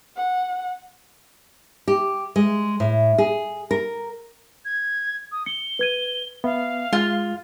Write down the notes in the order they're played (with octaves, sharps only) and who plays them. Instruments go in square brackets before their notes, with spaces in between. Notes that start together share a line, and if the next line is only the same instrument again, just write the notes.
[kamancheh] F#5
[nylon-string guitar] G4
G#3
A2
G#4
A#4
[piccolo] G#6
D#6
[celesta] C#7 [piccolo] G7
[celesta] B4 G#6 D#7
[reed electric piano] B3 [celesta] E5 [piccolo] F5
[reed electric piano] G#3 [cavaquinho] F4